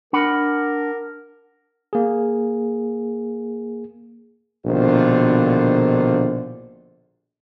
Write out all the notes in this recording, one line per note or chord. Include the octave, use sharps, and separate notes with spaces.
D4 A#4 F#5 B5
A#3 G#4
A#1 B2 D3 D#3 F4 C5